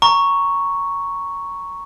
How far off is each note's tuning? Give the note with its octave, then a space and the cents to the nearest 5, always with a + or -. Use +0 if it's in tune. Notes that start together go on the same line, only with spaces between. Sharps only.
A#5 +0 C#6 +0